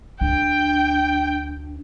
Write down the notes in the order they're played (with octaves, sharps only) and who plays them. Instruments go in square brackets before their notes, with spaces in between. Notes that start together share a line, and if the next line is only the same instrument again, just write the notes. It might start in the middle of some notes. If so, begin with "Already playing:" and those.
[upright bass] D2 [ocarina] D4 [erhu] G5